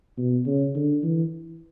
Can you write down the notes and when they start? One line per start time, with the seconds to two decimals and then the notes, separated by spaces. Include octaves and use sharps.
0.18 B2
0.46 C#3
0.75 D3
1.04 E3